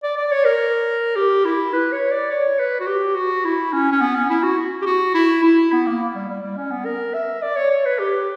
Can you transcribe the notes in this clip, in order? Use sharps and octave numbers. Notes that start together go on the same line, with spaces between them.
D5
D5
C#5
A#4
G4
E4
B4
C#5
D5
C#5
B4
F#4
G4
F#4
E4
C#4
C#4
B3
C#4
E4
F#4
G4
F#4
E4
E4
B3
A#3
G3
G3
G3
C#4
B3
A#4
E5
D5
C#5
C#5
B4
G4